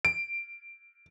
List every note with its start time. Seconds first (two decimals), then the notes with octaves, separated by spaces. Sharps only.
0.05 D7